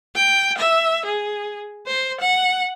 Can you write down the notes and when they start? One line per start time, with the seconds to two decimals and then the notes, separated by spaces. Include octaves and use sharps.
0.15 G5
0.58 E5
1.05 G#4
1.87 C5
2.20 F#5